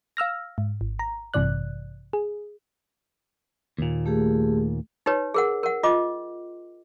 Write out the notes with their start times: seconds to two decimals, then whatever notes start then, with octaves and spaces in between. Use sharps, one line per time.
0.17 F5 E6 F6 A#6
0.58 G#2
0.81 G#1
0.99 A#5
1.34 A1 G2 C3 E3 D5 F#6
2.13 G#4
3.78 D#2 A#2
4.06 A3 G4 G#4
5.06 D#4 G4 B4 C#5
5.34 G#4 A#4 F#5
5.63 A#4 F#5
5.83 F4 D#5 D6